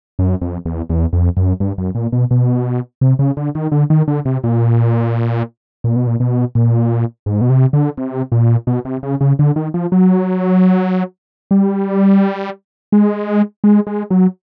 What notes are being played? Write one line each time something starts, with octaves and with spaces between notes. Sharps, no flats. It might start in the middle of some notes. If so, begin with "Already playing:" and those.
F#2
F2
E2
E2
F2
F#2
G2
F#2
A#2
B2
B2
C3
C#3
D3
D#3
D3
D#3
D3
C3
A#2
A#2
B2
A#2
B2
A#2
G#2
B2
C3
D3
C3
A#2
B2
C3
C#3
C#3
D3
D#3
F3
F#3
G3
G#3
G#3
G#3
F#3